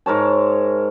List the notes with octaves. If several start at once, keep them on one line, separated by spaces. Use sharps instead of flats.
G#2 A#4 C#5 A5